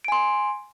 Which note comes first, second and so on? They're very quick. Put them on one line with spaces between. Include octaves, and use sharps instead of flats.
D7 G#5 C6